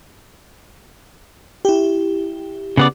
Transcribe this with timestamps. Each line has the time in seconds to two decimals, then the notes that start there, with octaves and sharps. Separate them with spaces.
1.65 E4 G4
2.77 C#3 B3 D5